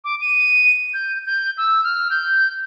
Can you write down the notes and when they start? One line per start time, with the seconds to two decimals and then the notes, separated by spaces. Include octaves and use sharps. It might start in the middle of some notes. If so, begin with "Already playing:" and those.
0.04 D6
0.21 D#7
0.94 G6
1.26 G6
1.58 E6
1.84 F6
2.10 G6